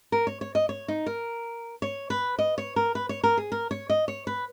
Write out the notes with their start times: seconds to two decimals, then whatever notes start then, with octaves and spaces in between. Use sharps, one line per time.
0.12 A#4
0.27 C#5
0.41 C#5
0.55 D#5
0.69 C#5
0.88 D#4
1.06 A#4
1.82 C#5
2.10 B4
2.39 D#5
2.58 C#5
2.76 A#4
2.95 B4
3.09 C#5
3.24 A#4
3.37 G#4
3.52 A#4
3.71 C#5
3.90 D#5
4.08 C#5
4.27 B4